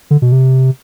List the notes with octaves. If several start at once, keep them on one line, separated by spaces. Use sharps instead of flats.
D3
B2
C3